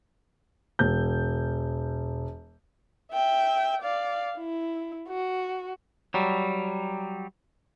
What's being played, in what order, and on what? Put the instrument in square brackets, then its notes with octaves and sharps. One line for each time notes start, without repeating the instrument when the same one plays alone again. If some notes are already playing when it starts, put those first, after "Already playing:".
[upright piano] E1 G6
[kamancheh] E5 G5
D5 F5
E4
F#4
[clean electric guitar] F#3 G3